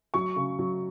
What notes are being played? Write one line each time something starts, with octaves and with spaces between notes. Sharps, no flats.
F#3 C#6
C#3
F#3